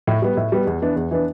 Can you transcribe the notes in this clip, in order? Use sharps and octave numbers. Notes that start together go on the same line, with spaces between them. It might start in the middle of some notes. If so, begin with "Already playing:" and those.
A2
G3 B3
A2
G3 B3
E2
E3 B3 D4
E2
E3 B3 D4